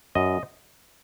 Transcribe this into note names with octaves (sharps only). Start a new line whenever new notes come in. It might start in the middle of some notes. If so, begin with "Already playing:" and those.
F#2 D#5